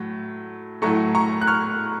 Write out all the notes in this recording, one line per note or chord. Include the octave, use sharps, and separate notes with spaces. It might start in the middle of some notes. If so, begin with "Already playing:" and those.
Already playing: A2 F#3 A3
A2 F#3 A3 A#5 C#6
A#5 C#6
F#6
C#6 F6